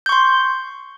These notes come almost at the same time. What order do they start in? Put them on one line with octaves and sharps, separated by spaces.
G6 C#6 C6